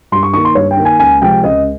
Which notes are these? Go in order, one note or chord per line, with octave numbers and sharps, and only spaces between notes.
G2 C6
C#6
D#3 A#3 C#6
C6
G2 C#5
G5
D#3 A#3
G#5
C#2 G#5
C3 F3 G#3 C4 G5
C#2 D#5